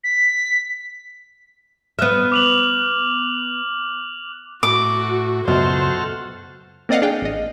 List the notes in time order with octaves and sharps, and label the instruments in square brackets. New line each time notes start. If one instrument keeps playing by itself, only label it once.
[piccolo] B6
[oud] B3 E5 [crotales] F6 F#6
[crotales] D6 F7 F#7
[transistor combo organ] A2 [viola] F#4 [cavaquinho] D6
[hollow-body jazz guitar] C#2 F#2 B2 [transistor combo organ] F#4 A4 F6 [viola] C5
[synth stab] A#3 C4 D5 D#5 F5 F#5
D4 G#4 F5 G5
A1 D#5